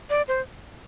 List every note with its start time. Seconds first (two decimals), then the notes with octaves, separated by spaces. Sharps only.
0.10 D5
0.28 C5